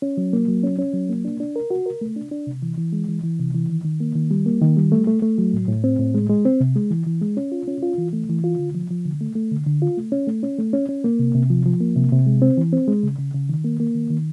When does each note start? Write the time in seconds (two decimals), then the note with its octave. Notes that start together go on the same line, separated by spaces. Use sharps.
0.02 C#4
0.17 F#3
0.33 A#3
0.48 F#3
0.64 C#4
0.79 C#4
0.94 F#3
1.09 A#3
1.25 D4
1.40 D4
1.56 A#4
1.71 F#4
1.86 A#4
2.01 A3
2.16 D4
2.32 D4
2.47 C3
2.62 E3
2.77 E3
2.93 G#3
3.08 E3
3.24 E3
3.39 C3
3.54 E3
3.70 D#3
3.85 D#3
4.00 A#3
4.15 D#3
4.31 G3
4.46 A#3
4.61 D#3
4.77 G3
4.92 A3
5.07 A3
5.22 A3
5.38 F#3
5.53 A2
5.68 A2
5.84 C4
5.99 A2
6.14 G#3
6.30 G#3
6.45 C4
6.60 C3
6.76 G#3
6.91 E3
7.06 E3
7.22 G#3
7.37 C#4
7.52 F4
7.68 C#4
7.83 F4
7.98 E3
8.13 A3
8.29 E3
8.44 F4
8.59 D3
8.75 F3
8.90 F3
9.05 D3
9.21 A3
9.35 A3
9.51 D3
9.66 D3
9.82 F4
9.97 A3
10.12 C#4
10.27 A3
10.43 C#4
10.58 A3
10.73 C#4
10.89 C#4
11.04 A#3
11.19 C3
11.35 C3
11.50 F3
11.65 F3
11.80 A#3
11.96 C3
12.12 C3
12.27 G#3
12.42 C4
12.57 E3
12.73 C4
12.88 G#3
13.03 C#3
13.19 C#3
13.34 C#3
13.49 D#3
13.64 A#3
13.80 A#3
13.95 D#3
14.10 D#3